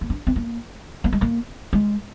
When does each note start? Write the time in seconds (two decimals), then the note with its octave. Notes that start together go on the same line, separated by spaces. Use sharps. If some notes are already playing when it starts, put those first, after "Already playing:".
0.01 A#3
0.10 D4
0.27 C4
0.36 A#3
1.04 A#3
1.13 G#3
1.21 A#3
1.73 G#3